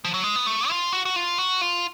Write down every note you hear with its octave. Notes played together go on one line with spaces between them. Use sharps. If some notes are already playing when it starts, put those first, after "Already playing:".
F3
F#3
G#3
B3
A3
F4
F#4
F#4
F4
F#4
F4